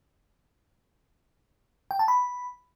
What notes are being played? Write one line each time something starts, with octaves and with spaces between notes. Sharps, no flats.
G5
A5
B5